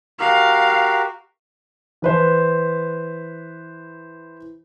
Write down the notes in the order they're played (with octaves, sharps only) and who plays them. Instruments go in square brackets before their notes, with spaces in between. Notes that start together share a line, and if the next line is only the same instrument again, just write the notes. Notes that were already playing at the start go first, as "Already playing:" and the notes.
[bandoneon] F#4 G4 A#4 [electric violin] F5
[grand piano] E3 B4 C5